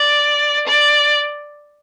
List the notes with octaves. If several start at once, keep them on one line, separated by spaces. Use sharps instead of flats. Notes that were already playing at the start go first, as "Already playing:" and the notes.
Already playing: D5
D5